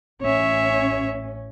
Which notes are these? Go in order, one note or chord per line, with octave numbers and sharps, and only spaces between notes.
A1 C#4 C#5 E5